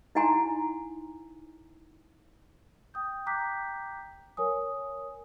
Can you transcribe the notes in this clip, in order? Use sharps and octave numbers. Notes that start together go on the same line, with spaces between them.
D#4 E4 F#5 G#5 A#5 C6
G5 D#6 G6
G5 A#5 D6 F#6 G6 B6
A#4 C#5 G#5 D#6